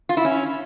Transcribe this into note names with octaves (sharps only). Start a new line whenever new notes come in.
F4
E4
C#4